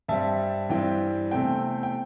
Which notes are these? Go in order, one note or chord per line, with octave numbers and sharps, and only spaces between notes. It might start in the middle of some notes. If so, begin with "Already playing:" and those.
G2 G3 C4 E5 A5
G2 E3 G3 C4 G5
E2 C3 A3 C4 G5
G5